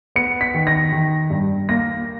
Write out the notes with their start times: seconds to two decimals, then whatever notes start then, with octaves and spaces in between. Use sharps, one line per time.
0.16 B3 C#7
0.41 B6
0.54 D#3
0.67 A#6
0.92 D#3
1.30 G2
1.69 A#3 A#6